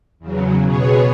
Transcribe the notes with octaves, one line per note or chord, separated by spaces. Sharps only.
E2 C#3 F#3
B2 B3 G#4 C#5